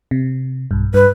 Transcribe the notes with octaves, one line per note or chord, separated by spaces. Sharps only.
C3
B1 G2
G2 B4